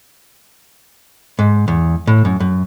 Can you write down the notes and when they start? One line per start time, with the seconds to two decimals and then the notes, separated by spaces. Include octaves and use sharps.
1.39 G#2
1.68 E2
2.07 A2
2.25 F#2
2.40 F#2